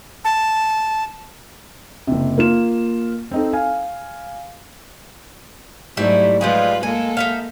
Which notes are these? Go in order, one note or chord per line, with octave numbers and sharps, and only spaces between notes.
A5
F#1 C3
A#3 F4 E7
C4 D#4 A4
F5 G#5
G#2 F#3 G3 A3 E4
F3 G3 G#3 F4 G#4 B4
G#3 A#3 A4 G#5
D#4 E5 F5